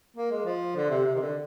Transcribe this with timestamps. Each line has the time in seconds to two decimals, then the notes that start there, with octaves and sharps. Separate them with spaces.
0.16 A#3
0.31 G#3
0.45 F3
0.76 D3
0.90 C3
1.06 C3
1.15 D#3
1.20 D3